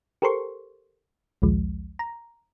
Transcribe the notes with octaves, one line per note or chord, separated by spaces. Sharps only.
G4 A4 A#4 C5 C6 C#6
A#1 D#2 F3 G#3
A#5